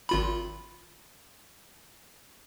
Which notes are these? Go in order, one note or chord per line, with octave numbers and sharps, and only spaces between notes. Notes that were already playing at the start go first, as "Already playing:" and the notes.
G#1 F4 B5